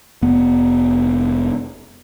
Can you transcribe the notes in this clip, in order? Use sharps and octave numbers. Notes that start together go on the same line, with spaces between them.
F1 B3